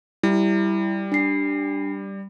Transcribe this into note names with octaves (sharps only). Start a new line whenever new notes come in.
G3 E4
D4 C7